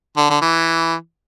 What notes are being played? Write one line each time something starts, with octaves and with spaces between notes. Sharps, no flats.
D3
D3
E3